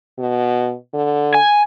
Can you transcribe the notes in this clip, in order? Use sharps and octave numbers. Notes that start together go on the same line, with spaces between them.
B2
D3
G#5